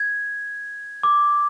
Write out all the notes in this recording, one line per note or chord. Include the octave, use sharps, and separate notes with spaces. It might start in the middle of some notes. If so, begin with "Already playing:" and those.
Already playing: G#6
D6